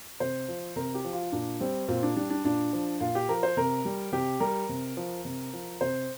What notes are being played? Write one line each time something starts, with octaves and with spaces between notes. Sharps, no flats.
C3 C5
F3
C3 A#4
G4
F3
F4
A#2 D4
G3 C4
A#2 C4
D4
G3 D4
D4
A#2 D4
F3
A#2 F4
G4
F3 A#4
C5
C3 A#4
G3
C3 G4
G3 A#4
C3
F3
C3
F3
C3 C5